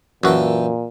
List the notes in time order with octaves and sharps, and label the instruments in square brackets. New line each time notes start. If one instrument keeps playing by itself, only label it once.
[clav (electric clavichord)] F#2 F#4 [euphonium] A#2 [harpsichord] E3 A4 G5